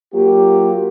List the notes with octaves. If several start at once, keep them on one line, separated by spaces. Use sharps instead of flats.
F#3 A#3 F4 G4